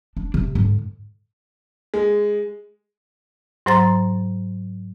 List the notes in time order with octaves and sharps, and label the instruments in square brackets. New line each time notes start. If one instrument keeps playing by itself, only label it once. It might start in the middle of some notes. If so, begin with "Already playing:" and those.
[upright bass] D4
C3
G#2 D3
[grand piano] G#3
[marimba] G#2 F#3 C5 A#5 C6 A6